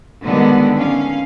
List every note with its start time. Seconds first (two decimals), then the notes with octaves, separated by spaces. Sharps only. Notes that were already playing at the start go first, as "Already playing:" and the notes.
0.22 D3 D#3 G3 G#3 B3
0.76 C#4 F5